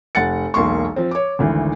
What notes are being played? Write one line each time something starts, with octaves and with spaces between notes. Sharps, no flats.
F1 F#5 A6 C#7
E1 B1 A#3 C6 C#6
F3 C4
C#5 D6
G#1 D2 E3